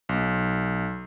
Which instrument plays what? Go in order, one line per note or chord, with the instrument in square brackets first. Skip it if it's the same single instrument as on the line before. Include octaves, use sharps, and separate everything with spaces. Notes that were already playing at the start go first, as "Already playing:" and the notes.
[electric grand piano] B1